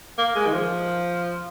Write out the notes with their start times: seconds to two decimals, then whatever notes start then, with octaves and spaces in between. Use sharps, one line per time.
0.18 A#3
0.35 G#3
0.46 D#3
0.53 F3